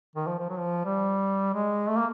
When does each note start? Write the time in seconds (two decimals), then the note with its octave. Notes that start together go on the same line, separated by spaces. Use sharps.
0.16 D#3
0.27 F3
0.39 F3
0.49 F#3
0.59 F3
0.86 G3
1.54 G#3
1.88 A3
1.97 A#3